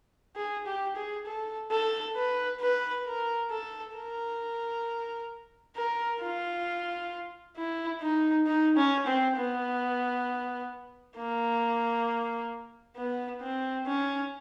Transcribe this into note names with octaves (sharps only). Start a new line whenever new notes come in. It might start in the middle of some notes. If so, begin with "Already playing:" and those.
G#4
G4
G#4
A4
A4
B4
B4
A#4
A4
A#4
A#4
F4
E4
D#4
D#4
C#4
C4
B3
A#3
B3
C4
C#4